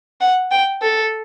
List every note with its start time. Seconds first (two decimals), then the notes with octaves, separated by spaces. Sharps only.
0.21 F#5
0.51 G5
0.82 A4